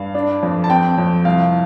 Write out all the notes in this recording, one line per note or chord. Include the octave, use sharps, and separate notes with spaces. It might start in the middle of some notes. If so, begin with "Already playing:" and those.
Already playing: G2 F5
D4
F2
A5
C4 G5
F2
C2 F5